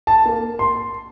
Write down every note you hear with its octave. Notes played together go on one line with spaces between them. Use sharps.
A5
A#3
C6